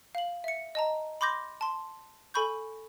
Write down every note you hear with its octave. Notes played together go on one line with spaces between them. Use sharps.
F5 F#7
E5 C#7
D#5 A5 A#5
B5 C6 D6 G6 A#6
A5 C6
A4 G#5 B5 C#6 G6